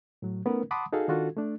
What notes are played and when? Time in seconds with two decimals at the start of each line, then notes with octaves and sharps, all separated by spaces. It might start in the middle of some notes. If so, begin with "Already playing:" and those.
0.22 A2 F#3
0.46 A3 B3 C#4 D#4 A#4 B4
0.71 F#5 A5 B5 C6 D6 D#6
0.93 D#4 F#4 G#4 A4 F5
1.08 D#3 D4 F4 F#4 A4
1.37 A3 D4